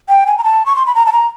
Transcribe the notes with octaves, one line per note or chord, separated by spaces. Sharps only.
G5
G#5
A#5
A5
C#6
C6
B5
A#5
A5
A#5